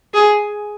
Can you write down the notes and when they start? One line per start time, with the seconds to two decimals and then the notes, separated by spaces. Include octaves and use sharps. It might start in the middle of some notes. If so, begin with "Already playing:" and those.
0.14 G#4